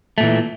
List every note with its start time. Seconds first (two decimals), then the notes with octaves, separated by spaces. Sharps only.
0.18 A3
0.20 A#2
0.23 E3